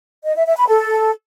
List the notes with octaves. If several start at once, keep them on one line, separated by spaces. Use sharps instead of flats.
D#5
E5
E5
B5
A4